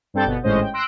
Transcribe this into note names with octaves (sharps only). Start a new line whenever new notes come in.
G2 G3 C4 A4 G6 A6
G1 B2 B3
G#1 A2 G#3 C#4 C5 D#5
G5
C6 E6 F#6 A#6 D7